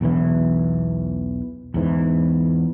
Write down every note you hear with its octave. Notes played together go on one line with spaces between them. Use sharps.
B1 E2 B2 E3
E2 G#2 E3